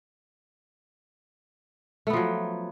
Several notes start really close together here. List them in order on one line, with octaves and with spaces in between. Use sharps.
A3 B3 F3 F#3